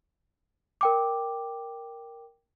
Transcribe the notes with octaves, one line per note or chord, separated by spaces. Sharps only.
A#4 G5 D6